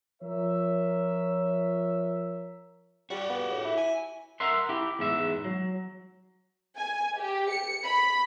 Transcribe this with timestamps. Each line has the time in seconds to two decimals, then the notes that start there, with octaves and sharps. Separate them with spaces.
0.22 F3 A#4 C#5 E5
3.10 G3 F#4 G4
3.30 B3
3.51 A2
3.65 E4
3.78 G#5
4.40 A#4 E5 F#5 C6
4.69 E4 G4
4.99 E2 G#2 E5
5.44 F#3
6.77 G#5
7.19 G4
7.50 C#7
7.84 B5